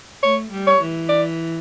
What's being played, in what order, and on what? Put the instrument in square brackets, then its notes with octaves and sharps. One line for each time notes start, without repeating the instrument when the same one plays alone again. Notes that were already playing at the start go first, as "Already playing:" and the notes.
[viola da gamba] A3 [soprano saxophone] C#5
[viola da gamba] G3
[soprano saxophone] C#5
[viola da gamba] E3
[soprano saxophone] D5